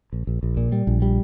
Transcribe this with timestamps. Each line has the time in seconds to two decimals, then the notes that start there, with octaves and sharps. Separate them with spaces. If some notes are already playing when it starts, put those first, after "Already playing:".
0.13 A#1
0.27 A#1
0.43 A#1
0.57 A#2
0.72 G3
0.87 A#1
1.02 G3